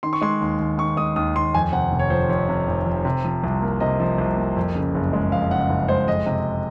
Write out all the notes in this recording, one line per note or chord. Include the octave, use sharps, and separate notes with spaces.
D#3 C6
C#6
G#3 C6
D#2
D#2
D#3 C#6
G#3 D#6
D#2 D#6
D#2 C6
F2 G#5
C3 F#5
F1
C#5
F3 C5
F2 C#5
C3
F1
F3
C3
F3
C2
A#3
C3 D#5
F3
C2
A#3
F2
C#3
F#1
G#3
F2 F5
C#3 F#5
F#1
G#3 C5
F2 D#5
C3